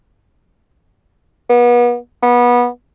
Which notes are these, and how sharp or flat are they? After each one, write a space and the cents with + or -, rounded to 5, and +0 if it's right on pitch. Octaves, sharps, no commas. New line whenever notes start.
B3 -35
B3 -25